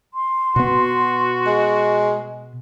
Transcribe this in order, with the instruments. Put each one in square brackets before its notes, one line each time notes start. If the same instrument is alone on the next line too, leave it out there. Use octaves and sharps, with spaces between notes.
[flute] C6
[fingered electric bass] B2 B3 [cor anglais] F#4
[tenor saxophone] G#3